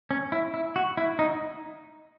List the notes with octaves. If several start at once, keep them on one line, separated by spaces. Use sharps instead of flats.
C#4
E4
E4
F#4
E4
D#4